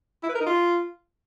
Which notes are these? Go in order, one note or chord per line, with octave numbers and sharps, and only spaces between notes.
E4
B4
A#4
D#4
F4